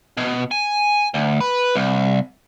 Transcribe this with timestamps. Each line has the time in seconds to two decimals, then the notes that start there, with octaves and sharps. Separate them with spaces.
0.18 B2
0.51 G#5
1.14 D2
1.41 B4
1.75 C2